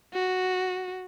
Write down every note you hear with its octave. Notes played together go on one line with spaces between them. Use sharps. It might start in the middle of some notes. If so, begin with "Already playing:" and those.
F#4